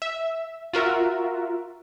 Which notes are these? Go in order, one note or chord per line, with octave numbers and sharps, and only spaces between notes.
E5
F4 F#4 A#4 E5